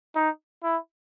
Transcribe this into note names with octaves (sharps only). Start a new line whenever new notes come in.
D#4
E4